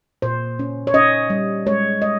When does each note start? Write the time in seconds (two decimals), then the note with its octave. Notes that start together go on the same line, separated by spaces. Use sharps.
0.22 A#2 C5
0.59 C#4
0.87 C#5
0.94 C#4 D#5
1.30 G3
1.66 G#3 C#5
2.02 G#3 D#5